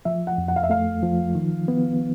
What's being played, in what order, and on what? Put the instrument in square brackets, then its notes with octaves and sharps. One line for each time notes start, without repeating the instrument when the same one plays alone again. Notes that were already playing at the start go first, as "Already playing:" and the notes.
[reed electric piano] F3 [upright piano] E5
[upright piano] F#5
[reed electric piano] F2
[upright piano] F#5
F5
E5
[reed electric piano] A3 [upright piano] F5
[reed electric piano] F3
D#3
B3